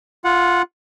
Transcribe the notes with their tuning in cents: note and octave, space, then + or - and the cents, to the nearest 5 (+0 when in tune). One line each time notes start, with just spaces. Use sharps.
F4 +0 F#5 -20